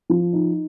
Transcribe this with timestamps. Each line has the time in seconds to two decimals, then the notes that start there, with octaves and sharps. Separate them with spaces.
0.10 F3
0.33 D#4